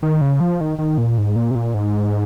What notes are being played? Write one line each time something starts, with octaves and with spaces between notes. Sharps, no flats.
D#3
C#3
F3
D#3
D#3
A#2
G#2
A#2
C3
A#2
G#2